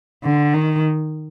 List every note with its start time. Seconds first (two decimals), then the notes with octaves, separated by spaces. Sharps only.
0.23 D3
0.53 D#3